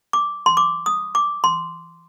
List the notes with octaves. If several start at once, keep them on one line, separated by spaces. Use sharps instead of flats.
D6
C6
D6
D#6
D6
C6